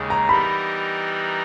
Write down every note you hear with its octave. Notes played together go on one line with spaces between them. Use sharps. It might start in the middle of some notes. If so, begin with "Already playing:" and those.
Already playing: D#2 C#3 G#3
A#5
E3 G3 B3 D#4 A#4 B5